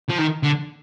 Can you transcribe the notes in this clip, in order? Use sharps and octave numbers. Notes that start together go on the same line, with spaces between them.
F3
D#3
D3